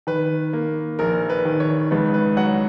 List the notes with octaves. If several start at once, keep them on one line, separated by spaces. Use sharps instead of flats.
D#3 B4
A#3
A#1 A#4
B4
D#3
C#5
C#2 B4
B4
F#3 F#5